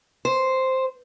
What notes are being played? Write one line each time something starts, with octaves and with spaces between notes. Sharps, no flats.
C5